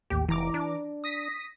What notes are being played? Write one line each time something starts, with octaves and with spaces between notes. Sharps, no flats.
A1 D#2 G4
F1 E3 A#5 D6
D4
D#6 A#6 B6